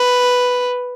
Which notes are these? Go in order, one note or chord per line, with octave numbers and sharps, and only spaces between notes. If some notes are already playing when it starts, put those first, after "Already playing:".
Already playing: B4